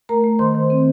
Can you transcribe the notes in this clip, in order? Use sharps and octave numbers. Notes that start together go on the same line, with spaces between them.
A3 A#4 A#5
A3
D#3 C5 C6
D#3
C4